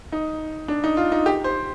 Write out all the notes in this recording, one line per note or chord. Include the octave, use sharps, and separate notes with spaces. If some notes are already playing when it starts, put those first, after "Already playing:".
D#4
D4
D#4
F4
D#4
G4
C5